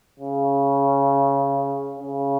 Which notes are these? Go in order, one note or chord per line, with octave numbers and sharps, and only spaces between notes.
C#3
C#3